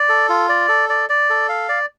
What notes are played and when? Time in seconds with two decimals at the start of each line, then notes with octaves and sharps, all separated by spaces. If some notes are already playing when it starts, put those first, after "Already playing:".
Already playing: D5
0.09 A4
0.29 F4
0.49 D5
0.69 A4
0.89 D5
1.09 D5
1.30 A4
1.49 F5
1.69 D5